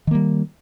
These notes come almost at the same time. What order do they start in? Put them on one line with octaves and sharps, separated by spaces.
D#3 A#3 G3